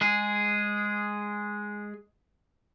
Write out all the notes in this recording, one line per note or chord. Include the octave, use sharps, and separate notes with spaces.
G#3 G#4